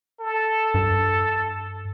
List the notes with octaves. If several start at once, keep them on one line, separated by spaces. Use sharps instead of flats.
A4
G2